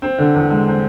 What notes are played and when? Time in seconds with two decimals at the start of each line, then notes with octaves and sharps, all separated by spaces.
0.02 C4
0.19 D3
0.35 E2
0.50 G#3
0.68 C4